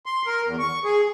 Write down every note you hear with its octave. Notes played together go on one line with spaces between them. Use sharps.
C6
A#4
E2
C#6
G#4